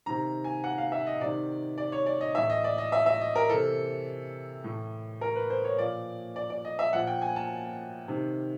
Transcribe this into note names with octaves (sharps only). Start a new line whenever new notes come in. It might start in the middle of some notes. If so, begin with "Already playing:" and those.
C3 D#3 A#5
G#5
F#5
F5
E5
D#5
C3 D#3 D5
D5
C#5
D5
D#5
A2 E3 E5
D#5
D5
D#5
E5
E5
D#5
A#4
C3 E3 A4
A2 E3
A#4
B4
C5
C#5
A#2 F3 D5
D5
D5
D#5
E5
A#2 F3 F#5
G5
G#5
A5
C3 D#3